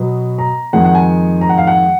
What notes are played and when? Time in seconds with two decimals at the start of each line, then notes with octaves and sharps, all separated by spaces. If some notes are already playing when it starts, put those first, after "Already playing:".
Already playing: B2 F#3 B3
0.38 A#5
0.73 F2 D#3 G#3 D#4 F#5
0.85 F#5
0.95 G#5
1.41 A#5
1.49 F#5
1.58 F5
1.67 F#5